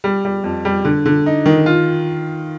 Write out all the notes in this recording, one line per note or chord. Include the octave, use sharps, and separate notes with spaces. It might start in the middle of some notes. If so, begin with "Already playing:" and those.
G3
G3
F2
G3
D3
D3
D#4
D#3
F4